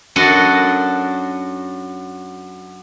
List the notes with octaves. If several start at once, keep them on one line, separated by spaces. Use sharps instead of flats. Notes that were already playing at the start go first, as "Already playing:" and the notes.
F#2 D4 F#4 A4 D#5